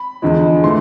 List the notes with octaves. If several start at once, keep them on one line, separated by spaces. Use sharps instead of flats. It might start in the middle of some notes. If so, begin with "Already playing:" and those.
Already playing: B5
E2 D3 F3 G#3
E3 A3 C6